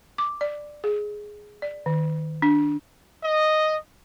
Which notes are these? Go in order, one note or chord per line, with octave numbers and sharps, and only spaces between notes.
D6
D5
G#4
D5
D#3
D4
D#5